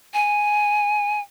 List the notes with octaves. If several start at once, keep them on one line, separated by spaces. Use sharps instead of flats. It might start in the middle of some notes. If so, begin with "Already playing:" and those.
G#5